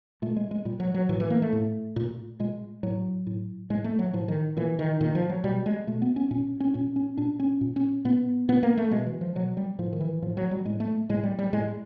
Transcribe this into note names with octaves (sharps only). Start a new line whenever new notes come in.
A#2 A3
G#3
G#3
A#2 G3
F#3
F#3
A2 E3
E3
A#3
A3
A2
A#2
A#2 G#3
A2 F#3
A2
A2 G#3
A3
F#3
A2 F3
D#3
A#2 E3
D#3
A#2 D#3
F3
F#3
B2 G3
G#3
B2 A3
B3
C#4
A#2 C#4
C#4
A#2 C#4
C#4
A#2 D4
C#4
A#2
C#4
A#2 B3
A#2 B3
A#3
A3
B2 G#3
E3
F3
B2 F#3
G3
A2 F3
D#3
E3
A2 F3
F#3
G3
A2 G#3
A3
A2 G#3
G3
G3
A2 G#3